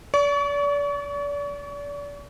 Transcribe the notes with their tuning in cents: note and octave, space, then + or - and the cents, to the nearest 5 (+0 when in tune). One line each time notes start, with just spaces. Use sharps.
D5 -35 C#6 +30